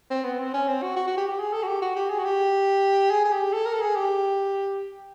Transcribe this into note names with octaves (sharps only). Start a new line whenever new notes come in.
C4
B3
C4
C#4
C4
F#4
F#4
F#4
G4
G4
G#4
A4
F#4
G4
F#4
G4
G#4
F#4
G4
G#4
G#4
G4
A4
A#4
A4
G#4
G4